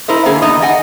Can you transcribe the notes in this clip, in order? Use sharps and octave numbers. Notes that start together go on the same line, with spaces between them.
E4 A#4 C5 D#5
D3 A#3 G#4
E2 D#4 D#5
D#5 F#5 G#5